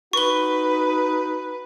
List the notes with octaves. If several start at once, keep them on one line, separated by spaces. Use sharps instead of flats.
D#4 F#4 B4 C#6 G7